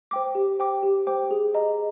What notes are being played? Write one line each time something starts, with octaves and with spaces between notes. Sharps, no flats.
C5 G5 D6
G4
C5 G5 D6
G4
C5 G5 D6
G#4
D#5 A#5